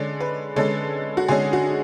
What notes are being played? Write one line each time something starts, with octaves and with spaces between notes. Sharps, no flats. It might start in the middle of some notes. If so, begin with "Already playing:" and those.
Already playing: D3 G#3 C#4 D5
B4
D3 G#3 C#4 A4
F#4
D3 G#3 C#4 G#4
F#4